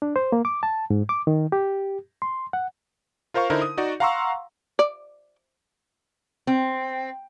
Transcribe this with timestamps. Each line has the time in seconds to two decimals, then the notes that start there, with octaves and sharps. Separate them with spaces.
0.02 D4
0.16 C5
0.32 A#3
0.45 D6
0.63 A5
0.90 G#2
1.09 D6
1.27 D#3
1.52 G4
2.22 C6
2.53 F#5
3.34 F4 A#4 C5 F5 C#6
3.50 D3 D#4 E4 A#4 C5
3.62 D#6
3.77 D#4 F#4 D5
4.00 F5 F#5 A#5 C6 C#6 E6
4.79 D5
6.47 C4